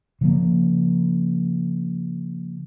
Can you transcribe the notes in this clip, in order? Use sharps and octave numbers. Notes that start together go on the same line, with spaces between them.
C#3 F3 A#3